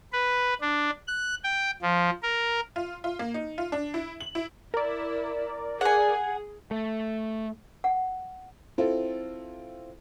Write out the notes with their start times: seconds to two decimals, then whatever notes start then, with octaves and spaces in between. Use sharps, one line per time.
0.13 B4
0.61 D4
1.07 F#6
1.44 G5
1.82 F3
2.23 A#4
2.76 F4
3.04 F4
3.19 A#3
3.34 D#4
3.58 F4
3.72 D4
3.94 E4
4.21 F#7
4.35 E4
4.74 E4 A#4 D5
5.81 G#4 F#5 G#5
6.71 A3
7.84 F#5
8.78 C4 E4 F4 A4